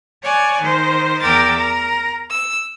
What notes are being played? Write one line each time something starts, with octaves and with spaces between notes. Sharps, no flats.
C#5 D5 F#5 G#5
D#3 C5
E2 A#4 G5 D6 E6 A6
A#4 A#5
E6